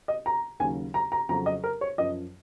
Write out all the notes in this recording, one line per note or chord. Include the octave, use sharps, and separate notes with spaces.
D#5
A#5
D#2 C#3 F#3 G#5
A#5
A#5
F2 C#3 F#3 A#5
D#5
A#4
C#5
F#2 F3 D#5